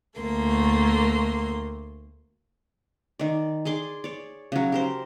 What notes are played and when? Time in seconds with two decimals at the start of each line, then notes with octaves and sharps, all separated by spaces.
0.20 D2 A3 A#3 C6
3.19 D#3 D5
3.65 G#4 D5 C6 D6
4.04 C#5 D5
4.52 C#3 F#3
4.72 G4 A#4 C5